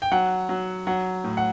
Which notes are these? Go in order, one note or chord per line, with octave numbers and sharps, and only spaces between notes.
G5
F#3 F#5
F#3
F#3 F#5
A2
F#5